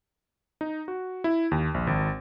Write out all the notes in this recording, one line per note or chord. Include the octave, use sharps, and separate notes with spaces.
D#4
F#4
E4
D#2
A#1
G#1